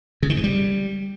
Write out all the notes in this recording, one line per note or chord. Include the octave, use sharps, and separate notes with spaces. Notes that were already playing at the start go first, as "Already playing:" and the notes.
C#3
D#3
G2
G3